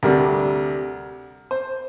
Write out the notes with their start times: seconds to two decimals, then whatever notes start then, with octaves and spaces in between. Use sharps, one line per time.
0.03 D2 C3 G3 D4 A#4
1.51 C5